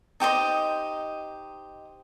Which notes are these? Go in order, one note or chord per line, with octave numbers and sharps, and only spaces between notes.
D#4 G4 C5 D#5